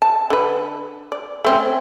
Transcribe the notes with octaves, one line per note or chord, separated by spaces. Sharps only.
A5
D3 B4
D5
A3 C4 C#4